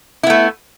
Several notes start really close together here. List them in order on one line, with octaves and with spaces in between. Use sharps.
E4 B3 A3